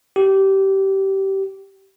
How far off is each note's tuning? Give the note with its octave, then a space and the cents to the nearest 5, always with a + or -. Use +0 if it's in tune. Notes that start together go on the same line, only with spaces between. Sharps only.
G4 -20